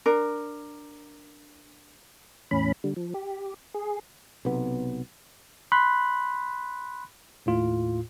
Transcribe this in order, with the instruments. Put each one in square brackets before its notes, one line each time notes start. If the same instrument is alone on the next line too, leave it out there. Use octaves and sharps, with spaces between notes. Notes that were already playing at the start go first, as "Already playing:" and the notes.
[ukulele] D4 A#4
[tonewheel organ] E2 A2 C#4 B5
D3 G3
F3
G4
G#4
[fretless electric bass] B1 C3 B3
[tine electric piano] B5 C6 F#6
D#2 A2 F4